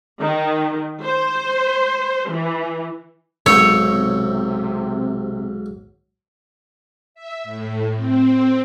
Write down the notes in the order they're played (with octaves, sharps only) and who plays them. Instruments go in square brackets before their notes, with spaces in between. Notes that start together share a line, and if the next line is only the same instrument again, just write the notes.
[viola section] D#3
C5
E3
[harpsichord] B1 G#2 G5 [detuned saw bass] C3 [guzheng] C#5 [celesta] E6
[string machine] E5
A2
C4